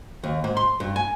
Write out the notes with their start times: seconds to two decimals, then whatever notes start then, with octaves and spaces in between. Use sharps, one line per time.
0.24 D#2
0.44 G#2
0.57 C6
0.80 G2
0.96 G#5